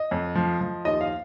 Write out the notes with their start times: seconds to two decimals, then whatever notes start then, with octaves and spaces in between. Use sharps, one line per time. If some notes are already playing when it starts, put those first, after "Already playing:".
Already playing: D#5
0.11 F2
0.35 F3
0.61 F3
0.85 D#2 D#5
1.01 F5